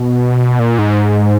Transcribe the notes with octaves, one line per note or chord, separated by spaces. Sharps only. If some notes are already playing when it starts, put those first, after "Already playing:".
Already playing: B2
A#2
G#2